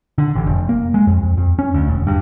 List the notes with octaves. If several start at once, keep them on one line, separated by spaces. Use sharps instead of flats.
D3
A1
F1
A#3
G#3
F2
F2
F2
C#4
D2
E1
G2